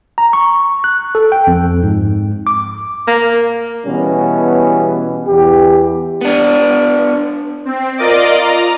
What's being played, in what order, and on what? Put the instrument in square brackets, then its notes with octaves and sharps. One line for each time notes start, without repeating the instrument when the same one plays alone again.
[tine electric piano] A#5
C#6
F#6
A4
G5
F2
G#2
D6
[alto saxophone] A#3
[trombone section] B2 E3 G3 B3 C#4
E2 E3 G4
[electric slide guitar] B3 D4
[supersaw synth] C4
F4 A#4 D5 D#5 D6
A#5